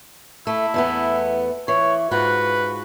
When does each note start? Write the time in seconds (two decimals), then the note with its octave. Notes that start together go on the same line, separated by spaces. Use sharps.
0.47 A3 E4
0.74 E2 A3 B3
1.68 E3 C#5
2.11 G#2 F4 F#4 B4